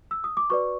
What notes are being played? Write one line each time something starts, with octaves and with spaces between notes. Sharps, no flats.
E6
D#6
D6
F#4 B4 D5 C#6